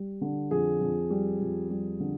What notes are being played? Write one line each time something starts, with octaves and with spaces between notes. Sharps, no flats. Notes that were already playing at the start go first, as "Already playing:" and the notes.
Already playing: G3
D3
F2 G#4
F2
G3
F2
G3
D3